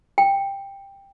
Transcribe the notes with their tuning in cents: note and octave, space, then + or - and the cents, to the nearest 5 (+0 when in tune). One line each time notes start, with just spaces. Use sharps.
G5 +10